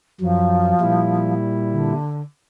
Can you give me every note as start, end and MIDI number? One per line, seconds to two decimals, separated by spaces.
0.21 0.73 42
0.21 1.33 53
0.21 0.73 54
0.81 1.93 46
0.81 1.93 55
0.81 1.93 64
1.71 2.21 50